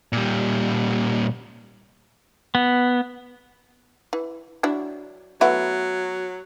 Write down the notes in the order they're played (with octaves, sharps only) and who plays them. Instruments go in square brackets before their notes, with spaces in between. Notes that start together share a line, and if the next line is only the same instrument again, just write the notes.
[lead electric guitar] A#2 G3
[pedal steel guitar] B3
[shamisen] E3
F#3 D4 E4
[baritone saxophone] F#3 [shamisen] A3 B3 E4